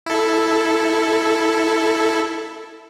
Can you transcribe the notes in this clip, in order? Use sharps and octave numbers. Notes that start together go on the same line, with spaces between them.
E4 A4